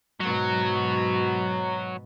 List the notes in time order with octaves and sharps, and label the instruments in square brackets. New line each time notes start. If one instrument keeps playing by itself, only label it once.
[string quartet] G#2 B2 [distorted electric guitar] F#3